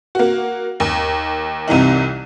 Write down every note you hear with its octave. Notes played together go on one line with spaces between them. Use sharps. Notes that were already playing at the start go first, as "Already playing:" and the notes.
A#3 F#4
D#2
C2 C3 E3 D#4